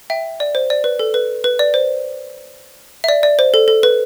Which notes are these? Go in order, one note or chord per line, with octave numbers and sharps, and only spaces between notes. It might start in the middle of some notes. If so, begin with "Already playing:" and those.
E5 G5
D5
C5
D5
B4
A4
B4
B4
D5
C5
E5
D5
D5
C5
A4
A4
B4